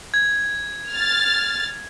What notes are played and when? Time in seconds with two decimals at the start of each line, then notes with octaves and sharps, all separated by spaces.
0.14 G#6
0.91 F6 A6